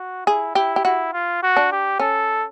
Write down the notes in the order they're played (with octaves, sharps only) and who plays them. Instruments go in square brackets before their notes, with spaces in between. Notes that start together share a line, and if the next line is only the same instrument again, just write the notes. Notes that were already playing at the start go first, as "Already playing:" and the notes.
Already playing: [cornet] F#4
[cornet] E4 [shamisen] G#4
[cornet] E4 [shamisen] G4
[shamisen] G4
[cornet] E4 [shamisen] F#4
[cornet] F4
F#4
[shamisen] D4
[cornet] G4
[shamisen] C#4 [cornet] A4